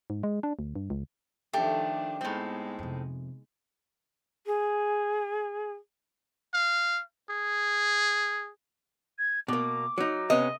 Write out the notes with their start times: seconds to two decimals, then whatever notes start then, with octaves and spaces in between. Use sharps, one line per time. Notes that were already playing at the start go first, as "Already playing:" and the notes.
0.10 G#2
0.23 G#3
0.43 D4
0.59 D2
0.76 G2
0.90 C#2
1.53 D#3 F3 A3 D4 G4
2.21 A2 G#3 B3 C4 D#4
2.79 F2 C3
4.46 G#4
6.54 F5
7.30 G#4
9.18 G#6
9.48 B2 A#3 D6
9.98 F#3 D#4
10.30 C3 B3 C#4 D#5